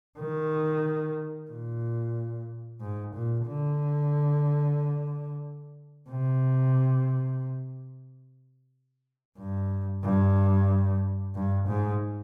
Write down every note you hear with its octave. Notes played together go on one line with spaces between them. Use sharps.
D#3
A#2
G#2
A#2
D3
C3
G2
G2
G2
G#2